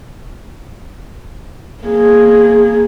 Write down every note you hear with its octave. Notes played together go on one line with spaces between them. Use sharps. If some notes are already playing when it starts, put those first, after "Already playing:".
A#3 G#4